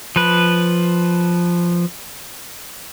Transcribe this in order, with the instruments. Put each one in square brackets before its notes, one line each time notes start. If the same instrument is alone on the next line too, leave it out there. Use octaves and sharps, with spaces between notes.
[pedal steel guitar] F3 B4